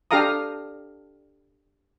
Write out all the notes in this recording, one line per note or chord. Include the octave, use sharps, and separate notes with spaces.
D4 G4 A4 F5 A#5 D#6